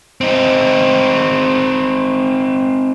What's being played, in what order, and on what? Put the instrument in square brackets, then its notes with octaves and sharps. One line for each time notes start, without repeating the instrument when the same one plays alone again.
[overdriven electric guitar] C4 D#4